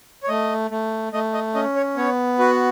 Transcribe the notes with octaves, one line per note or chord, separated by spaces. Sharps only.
C#5
A3 D#5
A3
A3 D#5
D#5
C#4 D#5
C#5
B3 C#5
F#4 B4